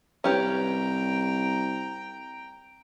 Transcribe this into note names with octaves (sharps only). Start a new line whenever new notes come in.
C2 C#4 G4 B4 G5 A#5